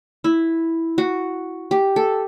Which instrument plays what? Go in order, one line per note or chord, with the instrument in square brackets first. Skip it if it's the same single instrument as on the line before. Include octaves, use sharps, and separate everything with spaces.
[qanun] E4
F#4
G4
A4